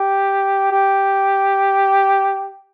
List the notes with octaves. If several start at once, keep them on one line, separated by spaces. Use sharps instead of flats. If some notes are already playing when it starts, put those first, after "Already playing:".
Already playing: G4
G4